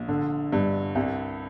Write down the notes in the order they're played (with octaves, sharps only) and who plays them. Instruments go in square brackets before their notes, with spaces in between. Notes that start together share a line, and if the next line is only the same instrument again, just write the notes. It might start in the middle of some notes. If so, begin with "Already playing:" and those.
Already playing: [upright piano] A#1
D3
G2
C2